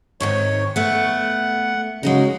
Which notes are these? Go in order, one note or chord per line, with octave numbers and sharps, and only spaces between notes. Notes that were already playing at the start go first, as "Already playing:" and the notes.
G#2 C3 D#3 C#5
A3 B3 F#5
C#3 F#3 G#3 A#3 D#4